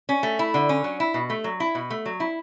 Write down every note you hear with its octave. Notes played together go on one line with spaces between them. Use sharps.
C#4
A3
E4
D3
C#4
F#3
E4
B2
A3
F#3
E4
B2
A3
F#3
E4